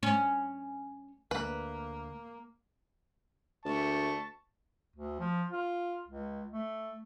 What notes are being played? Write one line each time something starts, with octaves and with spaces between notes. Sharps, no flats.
C#4
D2 A#3 B4
D2 A5 C#6
D2
F3
F4
C#2
A3